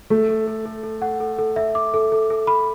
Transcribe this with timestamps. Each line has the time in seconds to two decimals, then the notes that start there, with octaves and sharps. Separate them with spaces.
0.10 A3 A4
0.29 A4
0.47 A4
0.66 A4
0.84 A4
1.02 F#5
1.20 A4
1.39 A4
1.56 E5
1.75 D6
1.94 A4
2.12 A4
2.30 A4
2.47 B5